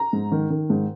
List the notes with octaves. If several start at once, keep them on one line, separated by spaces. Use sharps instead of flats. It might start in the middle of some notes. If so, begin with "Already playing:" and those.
Already playing: A#5
G#2
D#3
D#3
G#2